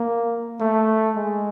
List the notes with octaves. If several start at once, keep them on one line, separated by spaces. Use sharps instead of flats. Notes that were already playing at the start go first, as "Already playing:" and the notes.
Already playing: A#3
A3
G#3